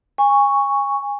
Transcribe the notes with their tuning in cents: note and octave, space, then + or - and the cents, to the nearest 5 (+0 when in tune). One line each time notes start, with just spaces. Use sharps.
G#5 -25 C#6 +0